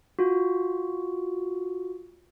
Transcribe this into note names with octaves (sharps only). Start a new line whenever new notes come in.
F4 F#4